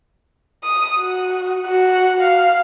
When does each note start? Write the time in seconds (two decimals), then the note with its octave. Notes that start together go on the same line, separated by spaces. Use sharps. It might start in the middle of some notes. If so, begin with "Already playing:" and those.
0.64 D#6
0.99 F#4
1.67 F#4
2.21 F5